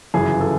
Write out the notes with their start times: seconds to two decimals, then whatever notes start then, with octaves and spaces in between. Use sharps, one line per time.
0.14 G1 F#2 C#3 E3 G#4
0.41 A4